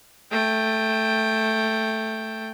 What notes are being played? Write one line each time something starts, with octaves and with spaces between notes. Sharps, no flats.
A3 G5